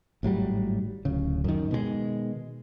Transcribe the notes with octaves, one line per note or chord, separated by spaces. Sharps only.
G#1 A2 F#3 G3
D1 C#3
F#2 D#3
B2 D#3 F3 G#3